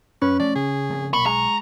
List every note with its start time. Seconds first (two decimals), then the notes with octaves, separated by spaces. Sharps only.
0.22 F#2 C#4 B4
0.40 F3 A3 D5
0.55 C#3 G#4
0.90 C#3 F3 C4
1.14 B1 A#2 B5 C#6
1.26 G#3 A#5